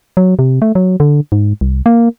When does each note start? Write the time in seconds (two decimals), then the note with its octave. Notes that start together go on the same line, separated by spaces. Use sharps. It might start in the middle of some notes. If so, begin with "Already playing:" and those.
0.17 F#3
0.39 C3
0.62 A3
0.75 F#3
1.00 D3
1.32 G#2
1.61 C2
1.86 A#3